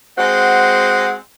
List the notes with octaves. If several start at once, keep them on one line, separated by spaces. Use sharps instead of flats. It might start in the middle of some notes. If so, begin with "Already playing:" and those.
G#3 C4 F#4 F#5